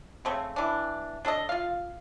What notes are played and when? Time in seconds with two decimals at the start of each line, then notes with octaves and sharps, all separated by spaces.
0.25 C#3 A3 C4
0.56 E3 D4
1.25 D4 A4 C#5 D#5
1.49 F4 F5